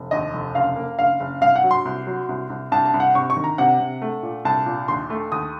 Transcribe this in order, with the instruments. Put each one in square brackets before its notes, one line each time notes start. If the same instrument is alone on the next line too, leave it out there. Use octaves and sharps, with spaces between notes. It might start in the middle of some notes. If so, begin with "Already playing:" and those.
Already playing: [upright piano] F1
D#2 D#5
F1
F#1 F5
A#3
F#1 F5
F#1
C2 F5
F#5
F#3
C6
C2
F#3
C2
C2
C2 A5
A5
C2
F#5
C3 C#6
C#6
D#3
A#5
C3 F#5
C3
A3
A#2
C2 A5
A#2
D#2 C6
A3
D#2 D#6